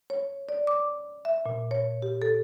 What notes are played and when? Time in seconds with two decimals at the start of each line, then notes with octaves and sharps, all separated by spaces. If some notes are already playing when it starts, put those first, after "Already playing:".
0.10 C#5
0.49 D5
0.67 D6
1.25 E5
1.46 A#2
1.71 C#5
2.02 G4
2.22 A4